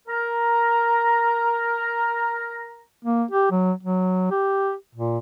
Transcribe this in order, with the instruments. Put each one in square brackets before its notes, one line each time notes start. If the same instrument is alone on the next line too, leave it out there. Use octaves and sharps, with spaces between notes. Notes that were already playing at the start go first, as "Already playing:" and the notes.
[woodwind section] A#4 A#5
[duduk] A#3
G4
F#3
F#3
G4
A#2